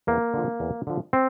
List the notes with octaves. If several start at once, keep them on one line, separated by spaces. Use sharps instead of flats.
E2 A#3
D3 F3
E2
D3 F3
C4